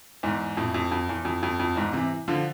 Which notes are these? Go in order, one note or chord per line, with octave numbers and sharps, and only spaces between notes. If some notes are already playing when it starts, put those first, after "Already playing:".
E2 G#2
F2 A2
F2
F2
E2
F2
F2
F2
E2 G#2
C3 E3
D3 F3